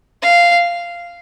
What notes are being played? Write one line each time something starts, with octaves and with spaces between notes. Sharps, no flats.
F5